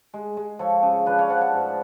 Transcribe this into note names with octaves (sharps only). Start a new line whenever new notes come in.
G#3
G#3
F3 A4 C#5
C#3
F3 B4 D5
C#5 F5
F3 D5 F#5
F#5 A5
G#2